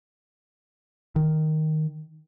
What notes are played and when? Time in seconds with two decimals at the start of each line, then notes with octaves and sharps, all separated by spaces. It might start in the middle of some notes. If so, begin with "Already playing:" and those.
1.16 D#3